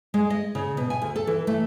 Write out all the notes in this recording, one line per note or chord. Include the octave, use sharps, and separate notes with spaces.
G#3
D#5
C#3
B2
G#5
D2
A4
E3
A3